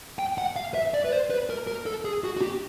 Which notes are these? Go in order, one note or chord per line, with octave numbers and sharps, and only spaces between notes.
G5
F#5
F5
E5
D5
B4
C5
B4
A#4
A#4
A4
G#4
F#4
F#4
G4